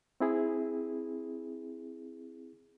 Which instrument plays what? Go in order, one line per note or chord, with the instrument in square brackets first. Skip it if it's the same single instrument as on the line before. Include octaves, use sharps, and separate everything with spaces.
[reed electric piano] C4 E4 G#4